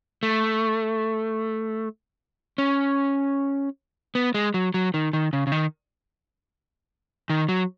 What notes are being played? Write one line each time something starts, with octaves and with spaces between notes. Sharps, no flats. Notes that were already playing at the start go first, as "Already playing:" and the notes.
A3
C#4
B3
G#3
F#3
F#3
D#3
D#3
C#3
C#3
D#3
D#3
F#3